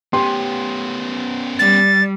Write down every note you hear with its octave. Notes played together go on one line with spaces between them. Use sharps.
B3 C#4 G4 G5 C6
G3 A6